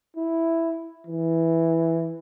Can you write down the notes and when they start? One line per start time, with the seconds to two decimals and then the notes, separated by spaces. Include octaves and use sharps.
0.17 E4
1.07 E3